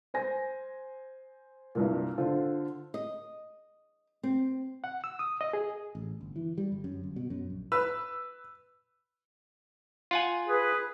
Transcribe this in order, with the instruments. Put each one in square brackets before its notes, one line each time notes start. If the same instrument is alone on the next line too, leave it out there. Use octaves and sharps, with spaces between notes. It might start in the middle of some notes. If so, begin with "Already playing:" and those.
[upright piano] C5 G#5 A#6
C2 G2 A#2
D3 F4 A4 C5
[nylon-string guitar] D#5
C4
[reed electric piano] F#5
E6
D#6
D#5
G#4
[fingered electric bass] A1
G1
E3
G3
G1
F#2
G1
B2
F#2
A#1
[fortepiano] B4 [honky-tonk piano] E6
[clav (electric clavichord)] F4 F#5 G#5
[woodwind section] G#4 B4